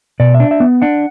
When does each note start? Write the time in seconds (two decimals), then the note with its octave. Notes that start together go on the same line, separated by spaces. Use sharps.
0.20 B2 D5
0.34 E5
0.40 D4
0.51 E5
0.60 B3
0.82 D4 F#5